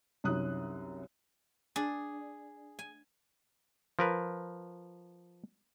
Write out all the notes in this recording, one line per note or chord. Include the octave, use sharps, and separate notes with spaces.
C2 F#2 D#4 D#6 F#6
D4 G#4
G#5
F3 A#4 B4